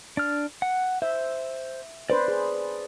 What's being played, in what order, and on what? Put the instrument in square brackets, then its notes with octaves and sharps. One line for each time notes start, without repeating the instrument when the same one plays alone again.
[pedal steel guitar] D4 F6
F#5
[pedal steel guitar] C5 [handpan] E5
[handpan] D4 B4 C5 [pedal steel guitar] D5
[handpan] G#4